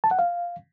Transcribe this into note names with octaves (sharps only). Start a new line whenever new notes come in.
A5
F#5
F5